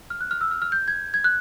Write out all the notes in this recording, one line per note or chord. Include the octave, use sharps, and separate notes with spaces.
F6
F#6
F6
E6
F6
F6
G6
G#6
G#6
F#6